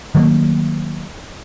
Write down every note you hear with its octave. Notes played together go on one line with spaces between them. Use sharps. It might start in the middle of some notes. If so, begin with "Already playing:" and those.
D#3 F#3 A3 A#3